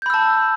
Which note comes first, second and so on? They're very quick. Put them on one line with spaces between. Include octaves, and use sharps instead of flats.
G6 B5 E6 A5